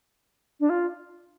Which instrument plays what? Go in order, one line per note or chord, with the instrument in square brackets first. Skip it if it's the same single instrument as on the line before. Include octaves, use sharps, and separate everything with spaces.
[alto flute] D4
F4